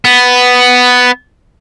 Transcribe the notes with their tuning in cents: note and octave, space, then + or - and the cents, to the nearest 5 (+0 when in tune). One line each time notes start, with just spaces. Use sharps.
B3 +5